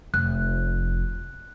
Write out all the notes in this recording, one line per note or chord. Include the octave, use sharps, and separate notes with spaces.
F1 F#6